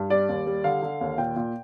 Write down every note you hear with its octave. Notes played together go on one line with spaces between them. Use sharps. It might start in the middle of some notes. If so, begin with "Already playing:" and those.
Already playing: G2
G3 D5
D#2
G3
D3 F5
D3
D#2
A#2 G5
A#2